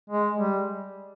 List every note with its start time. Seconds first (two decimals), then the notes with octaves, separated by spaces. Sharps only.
0.10 G#3
0.38 G3